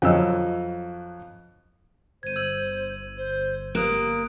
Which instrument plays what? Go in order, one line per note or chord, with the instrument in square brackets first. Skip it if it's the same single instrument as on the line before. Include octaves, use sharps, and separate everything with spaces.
[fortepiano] F2 F#3 C#5 D#5 E6
[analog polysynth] G1 [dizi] C5 [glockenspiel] G#6 D#7
[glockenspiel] E6 G#6 F#7
[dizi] C5
[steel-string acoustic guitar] A#3 [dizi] G4 [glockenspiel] D#6 F#6 D7